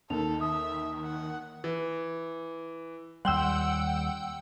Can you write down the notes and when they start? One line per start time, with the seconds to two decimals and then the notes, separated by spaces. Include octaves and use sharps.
0.10 D#2 D#3 A4 F7
0.41 E5 D#6
1.04 F#5
1.64 E3
3.25 D#2 G3 F#5 G5 C6 E6